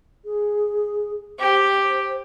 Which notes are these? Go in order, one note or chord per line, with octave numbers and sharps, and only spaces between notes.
G#4
G4 C5